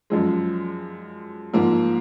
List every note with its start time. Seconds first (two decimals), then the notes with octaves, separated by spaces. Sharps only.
0.10 F#2 F3 G#3
1.53 G#2 F3 A#3